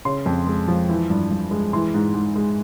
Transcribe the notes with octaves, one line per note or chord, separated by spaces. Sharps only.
C#3 C6
F2
G#3
F3
E3
G2
G2
G#3
E3 C6
G#2
G#2
G#3